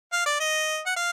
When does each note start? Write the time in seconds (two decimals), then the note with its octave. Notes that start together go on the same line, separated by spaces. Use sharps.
0.12 F5
0.26 D5
0.40 D#5
0.86 F#5
0.96 F5